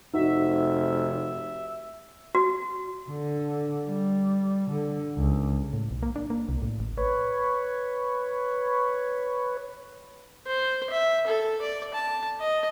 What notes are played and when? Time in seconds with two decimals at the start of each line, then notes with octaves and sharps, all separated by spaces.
0.13 F1 D#4 F#4 E5
2.35 F#4
3.10 D3
3.87 G3
4.71 D3
5.17 C#2
5.73 A2
5.91 B1
6.03 A#3
6.16 D4
6.30 A#3
6.49 C2
6.62 A2
6.80 A1
6.97 B4 C#5
10.47 C5
10.90 E5
11.27 A4
11.62 D5
11.94 A5
12.41 D#5